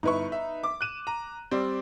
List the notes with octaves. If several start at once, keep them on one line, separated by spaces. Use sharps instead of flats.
G1 D#4 E4 B4 C#6
E5
D6
F#6 D#7 E7
A#5
G3 C4 D5